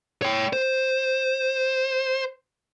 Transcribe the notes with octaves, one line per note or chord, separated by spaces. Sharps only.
C#5 G5
C5